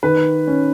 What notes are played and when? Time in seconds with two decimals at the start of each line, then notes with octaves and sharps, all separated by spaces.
0.03 D#3 B4
0.47 C#4